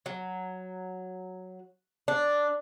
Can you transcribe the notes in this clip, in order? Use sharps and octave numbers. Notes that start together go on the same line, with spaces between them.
F#3
D4